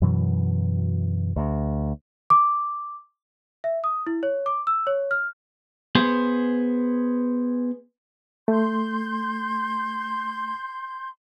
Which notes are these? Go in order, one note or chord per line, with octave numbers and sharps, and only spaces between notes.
F#2 B2 E3 F#3
D2
D6
E5
D#6
E4
C#5
D6
E6
C#5
F6
B3 G#4 C5
A3 C6 G6